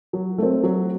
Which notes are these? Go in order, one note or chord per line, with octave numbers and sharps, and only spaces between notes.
F#3
A3 C4
F#3